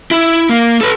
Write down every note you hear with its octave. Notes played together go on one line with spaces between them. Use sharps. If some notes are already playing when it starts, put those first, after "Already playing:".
E4
A#3
A4 B4